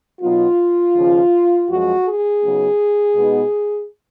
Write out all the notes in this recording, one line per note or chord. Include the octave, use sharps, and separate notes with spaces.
B2 F#3 B3 D#4 F4
D#2 C#3 F3
F#2 F3 G#3 F#4
G#4
C#3 F#3 B3 D#4
B2 G#3 B3 D#4